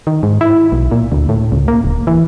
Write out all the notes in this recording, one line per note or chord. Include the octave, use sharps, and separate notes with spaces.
D#3
G#2
E4
B1
A#2
D2
A2
C#2
A#3
D1
E3